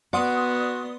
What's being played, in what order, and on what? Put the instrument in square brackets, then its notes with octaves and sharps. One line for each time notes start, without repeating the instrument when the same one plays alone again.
[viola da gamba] B3 [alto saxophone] F#4 [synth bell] D5 C6 D#6 [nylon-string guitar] F#5